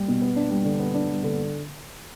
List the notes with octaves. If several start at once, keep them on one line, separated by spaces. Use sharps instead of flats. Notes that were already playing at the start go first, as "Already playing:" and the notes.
Already playing: G3
B2
B3
D4
G3
D3
B3
D4
G3
D3